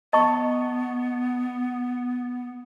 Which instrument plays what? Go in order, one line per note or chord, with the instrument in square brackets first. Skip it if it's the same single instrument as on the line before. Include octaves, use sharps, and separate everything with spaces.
[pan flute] B3 [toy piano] D#5 A5 C#6